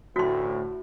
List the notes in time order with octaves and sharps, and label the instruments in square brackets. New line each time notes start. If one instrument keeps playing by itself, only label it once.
[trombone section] A1 D2 A2 [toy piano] F#4 C6